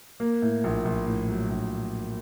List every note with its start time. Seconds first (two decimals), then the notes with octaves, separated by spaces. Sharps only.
0.20 A#3
0.42 A2
0.64 A#1
0.85 A#1
1.07 A2
1.28 F#3
1.50 A#1